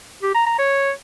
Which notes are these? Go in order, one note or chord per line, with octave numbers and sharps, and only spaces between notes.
G4
A#5
A#5
C#5